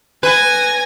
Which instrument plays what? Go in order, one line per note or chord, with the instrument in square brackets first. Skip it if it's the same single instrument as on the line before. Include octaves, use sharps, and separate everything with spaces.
[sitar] B4 [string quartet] G#5 G#6 A#6